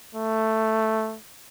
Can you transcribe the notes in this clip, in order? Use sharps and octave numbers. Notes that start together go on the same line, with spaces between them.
A3